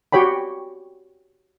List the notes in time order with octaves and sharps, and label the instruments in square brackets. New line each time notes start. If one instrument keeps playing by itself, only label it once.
[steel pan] F#4 G4 C#5 G5 B5